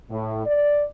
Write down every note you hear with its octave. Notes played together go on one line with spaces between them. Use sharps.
A2
D5